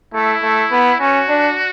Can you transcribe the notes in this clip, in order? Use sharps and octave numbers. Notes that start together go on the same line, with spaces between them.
A3 E4
A3
B3
C#4 F#4
D4